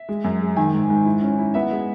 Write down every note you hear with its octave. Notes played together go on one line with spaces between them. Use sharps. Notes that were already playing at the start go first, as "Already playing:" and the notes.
Already playing: E5
G#3
F#2
G#3
D#3 G#5
G#2
G#2
E4
C#4
E4
B3 E5
G#3